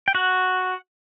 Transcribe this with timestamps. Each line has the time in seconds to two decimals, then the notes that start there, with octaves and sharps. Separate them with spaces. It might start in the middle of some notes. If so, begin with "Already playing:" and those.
0.08 G5
0.15 F#4 F#5